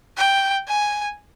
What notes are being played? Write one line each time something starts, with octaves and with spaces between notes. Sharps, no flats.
G5
G#5